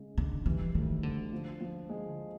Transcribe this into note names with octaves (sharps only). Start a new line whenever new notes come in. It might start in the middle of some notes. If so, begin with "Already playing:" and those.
Already playing: C#3 G#3
D3 G#3
E3 G3
D2 D#3
D2 D3
F3
F3
G#3